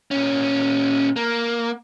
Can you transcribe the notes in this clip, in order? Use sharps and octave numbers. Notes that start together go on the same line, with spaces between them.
A#2 C#4
A#3